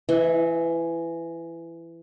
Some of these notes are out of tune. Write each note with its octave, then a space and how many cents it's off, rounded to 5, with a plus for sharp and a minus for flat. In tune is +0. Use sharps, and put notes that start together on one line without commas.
E3 +20 E5 -40